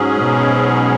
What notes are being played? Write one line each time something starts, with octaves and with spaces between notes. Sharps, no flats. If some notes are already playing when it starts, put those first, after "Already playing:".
Already playing: G#2 F#3 C#4 G#4
B2